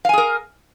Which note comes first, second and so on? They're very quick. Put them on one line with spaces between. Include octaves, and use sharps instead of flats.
F5 G#5 G#4 A#4